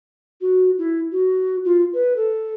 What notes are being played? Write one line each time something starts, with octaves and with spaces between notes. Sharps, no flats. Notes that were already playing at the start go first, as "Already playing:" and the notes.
F#4
E4
F#4
F4
B4
A4